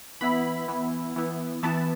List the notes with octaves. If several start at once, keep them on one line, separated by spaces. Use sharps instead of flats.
E3 B3 E4 B5
E3 B3 E4
E3 B3 E4
E3 B3 E4 A5